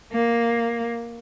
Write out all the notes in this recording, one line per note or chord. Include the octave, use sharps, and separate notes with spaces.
A#3